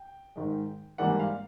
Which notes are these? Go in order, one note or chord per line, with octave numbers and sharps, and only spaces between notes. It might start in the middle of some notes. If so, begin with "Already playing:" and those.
Already playing: G5
G#2 D#3 G#3
G#2 E3 G3 A#3 D4 F#5
F5